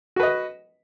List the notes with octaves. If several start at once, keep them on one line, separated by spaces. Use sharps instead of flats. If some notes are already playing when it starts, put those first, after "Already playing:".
F#4 B4 D#5